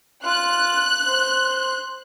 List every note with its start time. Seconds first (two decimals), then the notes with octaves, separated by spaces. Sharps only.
0.25 F4 F#6
1.08 C5